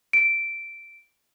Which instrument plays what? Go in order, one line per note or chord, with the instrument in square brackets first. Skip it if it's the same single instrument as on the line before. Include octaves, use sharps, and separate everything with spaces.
[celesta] D7